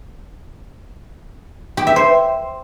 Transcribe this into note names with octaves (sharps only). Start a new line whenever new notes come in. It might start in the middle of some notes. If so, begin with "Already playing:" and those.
G4
E5
C5